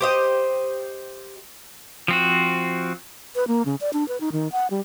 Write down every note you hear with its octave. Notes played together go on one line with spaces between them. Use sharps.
G4 C5 D#5
F3 C4 F#4
B4
A#3
C#3
D5
D4
B4
D#4
D#3
F#5
G3